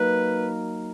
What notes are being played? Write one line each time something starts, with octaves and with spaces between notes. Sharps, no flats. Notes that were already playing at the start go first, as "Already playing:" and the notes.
Already playing: F#3 A#3 D#4 A#4 B4